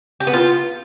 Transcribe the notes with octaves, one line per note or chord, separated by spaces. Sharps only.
G4
B3
F4